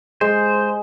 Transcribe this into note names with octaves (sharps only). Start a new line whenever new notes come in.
G#3 C5